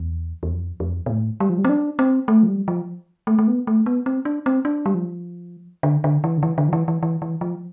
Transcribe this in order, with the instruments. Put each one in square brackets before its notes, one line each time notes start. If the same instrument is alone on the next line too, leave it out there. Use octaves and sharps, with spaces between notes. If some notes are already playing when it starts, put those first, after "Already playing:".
Already playing: [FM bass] E2
E2
F2
F2
B2
A2
G3
F3
G3
C4
D4
C4
A3
F3
G3
F3
A3
A3
B3
A3
B3
C4
D4
C4
D4
G3
F3
D3
D3
E3
D3
E3
D3
F3
E3
E3
E3
E3
F3